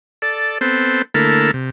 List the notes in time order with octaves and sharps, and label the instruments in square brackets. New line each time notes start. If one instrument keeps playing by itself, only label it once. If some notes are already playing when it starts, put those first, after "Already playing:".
[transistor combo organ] A4 D5
B3 C4 A4 C5
D3 A3 A#3 E4 A4 A#4
C3